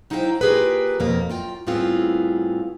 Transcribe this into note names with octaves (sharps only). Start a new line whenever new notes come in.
F#3 D#4 E4 C5 F5 G5
A#3 F4 G4 G#4 A#4 B4
F2 B2 A#3
F#2 F4 G5
A2 G3 B3 C4 F4 G#4